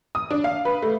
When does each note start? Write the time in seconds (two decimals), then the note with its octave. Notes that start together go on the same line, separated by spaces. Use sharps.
0.15 D#6
0.31 D4
0.44 F5
0.65 B4
0.82 A3